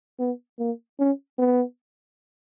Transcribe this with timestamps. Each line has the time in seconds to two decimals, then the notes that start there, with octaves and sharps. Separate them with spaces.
0.19 B3
0.59 A#3
0.99 C#4
1.38 B3